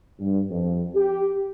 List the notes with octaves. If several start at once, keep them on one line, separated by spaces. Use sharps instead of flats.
G2
F2
G4